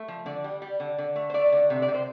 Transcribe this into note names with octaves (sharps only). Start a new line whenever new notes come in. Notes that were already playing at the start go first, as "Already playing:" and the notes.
Already playing: A3
F3
D3 D5
G3
G3
D3
D3
A3
C5
A3 D5
D3
C3
D5
C3
C5